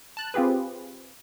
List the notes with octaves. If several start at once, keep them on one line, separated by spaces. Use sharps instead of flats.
A5 F#6
C4 F4 G4 G#4 B4